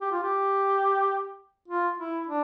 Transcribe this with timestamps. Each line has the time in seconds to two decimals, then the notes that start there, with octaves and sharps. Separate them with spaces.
0.01 G4
0.12 F4
0.23 G4
1.68 F4
1.98 E4
2.27 D4